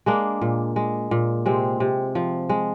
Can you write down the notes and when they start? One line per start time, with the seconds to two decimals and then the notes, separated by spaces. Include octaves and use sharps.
0.06 G#3 A#3 D4
0.42 A#2
0.76 G#3
1.11 A#2
1.46 C3 G#3 C4
1.80 C3
2.15 F3
2.49 G#3